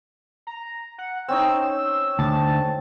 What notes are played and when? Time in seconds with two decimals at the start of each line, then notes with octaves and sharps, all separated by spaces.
0.47 A#5
0.98 F#5
1.28 C4 C#4 D#4 E6
2.19 D2 A5